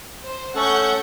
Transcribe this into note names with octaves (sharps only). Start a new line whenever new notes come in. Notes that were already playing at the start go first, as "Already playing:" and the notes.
C5
A3 C#4 A4 F#5 C#6 G6